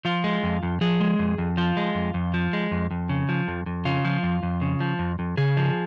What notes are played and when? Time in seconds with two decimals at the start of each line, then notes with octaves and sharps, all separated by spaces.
0.05 F3 F4
0.24 G#3
0.43 F2
0.63 F2
0.81 F3 G#4
1.00 G#3
1.19 F2
1.38 F2
1.57 F3 F4
1.77 G#3
1.95 F2
2.14 F2
2.34 F3
2.53 G#3
2.71 F2
2.91 F2
3.09 C#3
3.29 F3
3.48 F2
3.66 F2
3.85 C#3 F4
4.05 F3
4.23 F2
4.43 F2
4.61 C#3
4.80 F3
4.99 F2
5.19 F2
5.37 C#3 G#4
5.57 F3